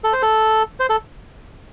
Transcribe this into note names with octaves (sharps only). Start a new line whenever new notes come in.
A4
C5
A4
C5
A4